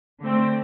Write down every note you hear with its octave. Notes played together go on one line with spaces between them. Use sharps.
D3 A3 C4